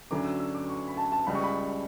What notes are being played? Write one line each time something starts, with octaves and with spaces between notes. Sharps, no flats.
D2 D3 F#3 C#4 D6
E6
E6
D6
C#6
B5
A5
A5
C#2 C#3 G3 B5
C#6
B5